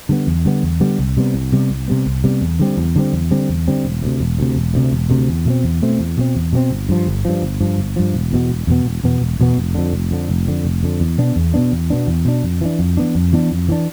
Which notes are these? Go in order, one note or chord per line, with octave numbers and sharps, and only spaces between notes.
D3 G3 B3
E2
D3 G3 B3
E2
D3 G3 B3
C2
C3 G3 B3
C2
C3 G3 B3
C2
C3 G3 B3
C2
C3 G3 B3
E2
D3 G3 C4
E2
D3 G3 C4
E2
D3 G3 C4
E2
D3 G3 C4
E1
D2 C3
E1
D2 C3
E1
D2 C3
E1
D2 C3
E2
B2 A3 C4
E2
B2 A3 C4
E2
B2 A3 C4
E2
B2 A3 C4
G1
G2 F3
G1
G2 F3
G1
G2 F3
G1
G2 F3
E1
E2 B2 B3
E1
E2 B2 B3
E1
E2 B2 B3
E1
E2 B2 B3
F1
F2 D3
F1
F2 D3
F1
F2 D3
F1
F2 D3
E2
B2 B3 D4
E2
B2 B3 D4
E2
B2 B3 D4
E2
B2 B3 D4
F2
E3 B3 D4
F2
E3 B3 D4
F2
E3 B3 D4
F2
E3 B3 D4